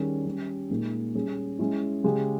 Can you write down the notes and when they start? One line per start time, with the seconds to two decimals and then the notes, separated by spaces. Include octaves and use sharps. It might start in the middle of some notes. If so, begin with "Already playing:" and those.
Already playing: D#3 G3 C#4 G#4
0.26 G3 C#4 G4
0.70 A#2 G#3 D#4
1.15 G3 C#4 G#4
1.59 G#3 C#4 E4
2.04 C#3 G#3 C#4 G4